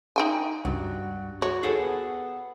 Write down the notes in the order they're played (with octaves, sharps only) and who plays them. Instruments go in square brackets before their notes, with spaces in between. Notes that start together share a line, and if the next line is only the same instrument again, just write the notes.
[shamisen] D#4 G5 G#5
[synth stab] C#2 [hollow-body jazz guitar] G2 [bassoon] F#4
[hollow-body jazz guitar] F#4 [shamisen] C#5
[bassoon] D#2 [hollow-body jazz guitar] G#4 A4 F#5
[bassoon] B3